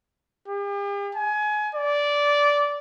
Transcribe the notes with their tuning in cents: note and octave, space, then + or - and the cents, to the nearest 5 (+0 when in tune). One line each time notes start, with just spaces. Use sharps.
G4 +45
G#5 +25
D5 -15